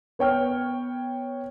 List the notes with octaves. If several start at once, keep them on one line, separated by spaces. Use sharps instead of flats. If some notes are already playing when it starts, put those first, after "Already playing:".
B3 C#5 G5 F6